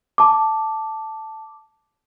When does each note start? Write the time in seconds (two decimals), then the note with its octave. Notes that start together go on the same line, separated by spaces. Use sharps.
0.18 A5 D6